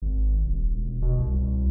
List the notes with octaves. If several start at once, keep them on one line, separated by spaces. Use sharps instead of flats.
G#1
D#1
E1
B2
C2